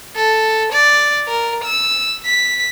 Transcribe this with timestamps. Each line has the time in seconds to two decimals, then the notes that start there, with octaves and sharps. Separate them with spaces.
0.16 A4
0.73 D5
1.28 A#4
1.64 E6
2.26 B6